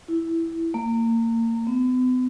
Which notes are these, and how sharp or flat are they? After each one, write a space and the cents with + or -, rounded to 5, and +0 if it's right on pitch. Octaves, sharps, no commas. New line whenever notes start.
E4 +0
A#3 -30
B3 +45